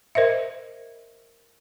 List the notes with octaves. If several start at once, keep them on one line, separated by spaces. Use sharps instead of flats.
A#4 C5 D#5 E5